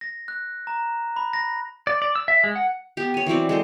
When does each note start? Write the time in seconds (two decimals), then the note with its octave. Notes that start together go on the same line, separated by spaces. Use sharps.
0.01 A#6
0.28 F#6
0.67 A#5
1.16 B5
1.33 A#6
1.87 D5
2.02 D5
2.15 E6
2.28 E5
2.44 G#3
2.56 F#5
2.97 B3 G4
3.14 C#5 G#5
3.26 E3 F#3 C4 D5
3.49 G#3 A4 C5